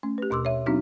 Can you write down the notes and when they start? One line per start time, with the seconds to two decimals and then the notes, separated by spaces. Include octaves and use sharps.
0.03 A3 C#4
0.18 G4 B4
0.30 D#2 B2 C6 D6 E6
0.45 C#5 E5
0.66 F#3 B3 C4 D4 D#4 F#4